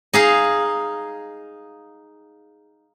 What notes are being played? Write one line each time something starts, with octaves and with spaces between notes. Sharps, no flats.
D#4 G#4 F5